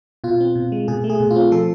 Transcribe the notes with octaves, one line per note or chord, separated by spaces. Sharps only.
B2 F4
C4
B2
G#3
B2 G#4
A3
G#4
B2
F4
C4
F3 A4